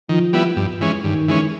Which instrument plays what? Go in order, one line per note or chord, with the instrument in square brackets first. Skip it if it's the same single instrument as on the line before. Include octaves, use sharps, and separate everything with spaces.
[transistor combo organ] D#3 [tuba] F3
[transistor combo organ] G3 B3 E4
G2
E3 G#3 C#4
[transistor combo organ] G2 [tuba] D#3
[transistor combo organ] E3 G#3 C#4